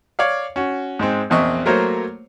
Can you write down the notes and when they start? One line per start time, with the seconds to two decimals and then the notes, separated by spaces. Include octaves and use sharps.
0.19 C#5 D5 F5
0.56 C#4 F#4
0.99 G#2 G#3 C4
1.30 A#1 E2 C4 D#5 C#6
1.66 F#3 A3 A#3 A#4 C5 C#5